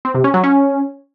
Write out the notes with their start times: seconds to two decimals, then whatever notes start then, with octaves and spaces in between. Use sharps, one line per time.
0.05 C4
0.15 C3
0.24 C#4
0.34 F#3
0.44 C#4